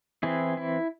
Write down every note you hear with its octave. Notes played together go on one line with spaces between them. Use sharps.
E3 C4 E4 G#4
E4